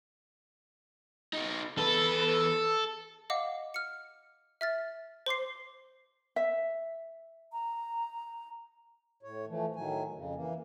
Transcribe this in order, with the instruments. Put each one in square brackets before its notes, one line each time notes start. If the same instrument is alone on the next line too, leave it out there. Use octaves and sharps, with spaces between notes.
[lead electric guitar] D#4 F#4
[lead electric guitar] E2 B4 [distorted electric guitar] A4
[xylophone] D#5 F5 F#5 D6
F6 C#7
E5 F6 A6
C5 C6 D6 C7
[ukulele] E5
[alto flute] A#5
[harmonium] A2 C#5
E3 F3 A3
A2 D#3 F#3 G#5
F2 C#3
E3 A#3